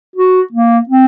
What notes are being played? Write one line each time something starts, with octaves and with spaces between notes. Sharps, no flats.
F#4
A#3
C4